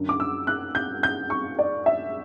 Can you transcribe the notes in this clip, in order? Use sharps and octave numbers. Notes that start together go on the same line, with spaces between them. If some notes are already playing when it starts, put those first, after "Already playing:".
Already playing: F#2 D3
D6
E6
F#6
G6
G6
C#6
D5
E5